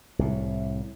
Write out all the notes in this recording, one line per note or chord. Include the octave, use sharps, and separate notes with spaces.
C2 A2